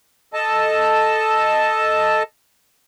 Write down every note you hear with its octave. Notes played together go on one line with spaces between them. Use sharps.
A4 D#5 A5